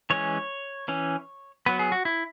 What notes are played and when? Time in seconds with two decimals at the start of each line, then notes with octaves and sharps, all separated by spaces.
0.10 E3 G#3 C#4 C#5
0.88 E3 C#4
1.66 F#3 B3 B4
1.79 G#4
1.92 F#4
2.05 E4